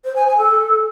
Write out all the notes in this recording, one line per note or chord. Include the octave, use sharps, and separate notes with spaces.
C5
G#5
G#5
A4